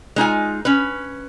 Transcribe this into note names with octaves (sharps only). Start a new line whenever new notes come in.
G#3 D#4 F4 G#5
C#4 B4